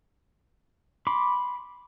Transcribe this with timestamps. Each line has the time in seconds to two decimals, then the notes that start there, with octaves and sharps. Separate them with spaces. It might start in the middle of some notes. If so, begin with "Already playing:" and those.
1.07 B5 C6 D6